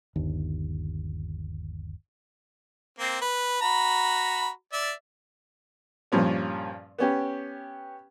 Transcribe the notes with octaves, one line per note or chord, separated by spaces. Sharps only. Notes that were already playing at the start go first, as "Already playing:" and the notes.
G1 D#2
A#3 C4
B4
F#4 A#5 B5
D5 E5
G2 A#2 F3 C#4
B3 C#4 G4